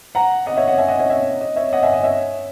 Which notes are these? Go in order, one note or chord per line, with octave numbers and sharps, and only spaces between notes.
F#5 A#5
D#5 F#5
C#5 E5
D#5 F#5
E5 G#5
D#5 F#5
C#5 E5
C#5 E5
D#5
C#5 E5
D#5 F#5
E5 G#5
D#5
C#5 E5